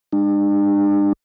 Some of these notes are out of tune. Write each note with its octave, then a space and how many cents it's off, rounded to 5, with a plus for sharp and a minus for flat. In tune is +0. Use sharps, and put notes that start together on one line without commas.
G#3 -40 D4 +40